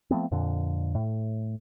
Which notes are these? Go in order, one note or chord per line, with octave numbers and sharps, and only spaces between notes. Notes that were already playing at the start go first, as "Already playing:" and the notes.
F3 A3 B3 C4
F2 A#2 D3
A2